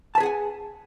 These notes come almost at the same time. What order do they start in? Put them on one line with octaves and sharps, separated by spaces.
A5 B4 G#4 F#5 G#5